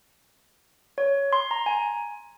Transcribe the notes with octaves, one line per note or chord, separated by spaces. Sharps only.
C#5
C6
A#5
G#5